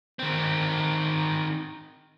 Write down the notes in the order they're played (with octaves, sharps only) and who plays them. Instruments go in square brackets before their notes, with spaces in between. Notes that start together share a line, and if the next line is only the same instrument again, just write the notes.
[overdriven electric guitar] D#3 C4